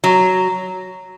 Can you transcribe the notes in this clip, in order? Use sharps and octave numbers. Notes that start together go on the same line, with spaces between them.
F#3